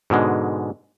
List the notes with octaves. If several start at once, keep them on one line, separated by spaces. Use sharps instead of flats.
G#2 B2 D3 G#3